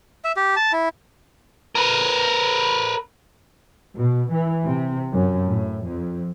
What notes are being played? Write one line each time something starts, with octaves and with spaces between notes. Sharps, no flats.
E5
G4
A5
E4
A#4 B4
B2
E3
C3
F#2
A2
F2